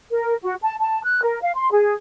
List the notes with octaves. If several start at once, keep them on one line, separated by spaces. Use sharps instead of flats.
A#4
F#4
A5
A5
F#6
A#4
F5
C6
G#4